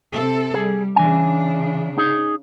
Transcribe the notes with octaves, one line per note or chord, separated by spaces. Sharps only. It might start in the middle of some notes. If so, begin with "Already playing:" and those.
C3 C4 A4
G3 G#4
C#3 E3 D4 G#5
D#4 G#4